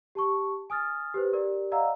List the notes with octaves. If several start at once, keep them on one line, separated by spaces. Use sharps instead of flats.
G4 A5 C#6
G#5 D#6 F6 A6
G4 B4 C5
G4 A#4 D5
D5 D#5 F5 F#5 A#5 E6